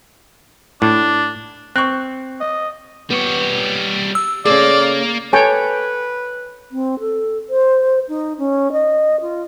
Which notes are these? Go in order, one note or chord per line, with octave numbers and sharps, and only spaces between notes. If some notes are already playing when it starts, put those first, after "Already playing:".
A2 D4
C4 C#6 F#6
D#5
G3 B3 C#5
E6
C#3 A3 A#3 G#4 D5
A4 B4 C#5 G5 G#5
C4
A4
C5
D#4
C#4
D#5
F4